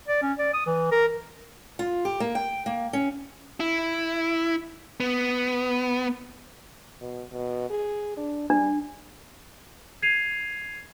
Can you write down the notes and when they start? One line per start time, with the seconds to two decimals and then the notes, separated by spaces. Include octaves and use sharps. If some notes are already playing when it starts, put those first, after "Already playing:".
0.08 D5
0.22 C#4
0.39 D5
0.54 D#6
0.67 E3
0.92 A#4
1.79 F4
2.05 G4
2.20 A#3
2.35 G5
2.66 A#3
2.93 C#4
3.60 E4
5.00 B3
7.01 B2
7.32 B2
7.70 G#4
8.17 D4
8.50 G3 D4
10.02 G#6 C7 D#7 F7